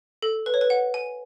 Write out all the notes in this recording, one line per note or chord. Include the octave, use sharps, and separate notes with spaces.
A4
B4
C#5
B4
F#5
G#5